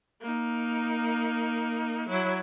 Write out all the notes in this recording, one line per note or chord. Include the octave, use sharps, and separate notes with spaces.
A#3 D#4
F#3 E4